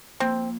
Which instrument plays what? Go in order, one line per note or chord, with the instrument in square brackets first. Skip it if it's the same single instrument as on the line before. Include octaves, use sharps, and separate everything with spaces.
[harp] F3 A#3 [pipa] C4